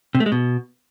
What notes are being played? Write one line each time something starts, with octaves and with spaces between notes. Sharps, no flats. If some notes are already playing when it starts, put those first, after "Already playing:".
C3
A3
G#3
B2